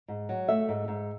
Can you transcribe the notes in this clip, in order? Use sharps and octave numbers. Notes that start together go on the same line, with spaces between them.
G#2
F#3
A3 E5
G#2
G#2